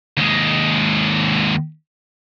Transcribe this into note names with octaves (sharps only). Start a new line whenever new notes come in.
D#2 G#3